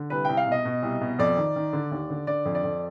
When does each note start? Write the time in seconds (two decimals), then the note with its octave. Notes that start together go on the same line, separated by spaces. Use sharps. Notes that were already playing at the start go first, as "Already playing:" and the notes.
Already playing: D3
0.10 C2 B4
0.25 C2 G5
0.37 F5
0.46 B2
0.52 D#5
0.65 B2
0.82 C2
1.01 B2
1.19 F2 D5
1.37 D#3
1.56 D#3
1.73 D3
1.91 D#2
2.10 D3
2.27 D3 D5
2.45 F2
2.55 D5
2.63 F2